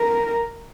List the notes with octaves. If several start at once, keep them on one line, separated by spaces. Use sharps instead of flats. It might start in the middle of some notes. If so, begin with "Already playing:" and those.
Already playing: A#4